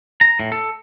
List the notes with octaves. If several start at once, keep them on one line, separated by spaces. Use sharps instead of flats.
A#5
A2
A4